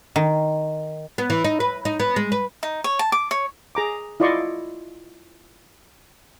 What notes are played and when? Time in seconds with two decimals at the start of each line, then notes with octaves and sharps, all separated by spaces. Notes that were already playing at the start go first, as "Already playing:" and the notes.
0.16 D#3
1.18 B3
1.30 E3
1.44 D#4
1.60 B4
1.85 D#4
2.00 B3
2.16 G#3
2.32 B4
2.63 D#4
2.84 C#5
2.99 A5
3.12 D6
3.31 C#5
3.75 G#4 A#5 D6
4.20 E4 F4 D5 D#5 C6 C#6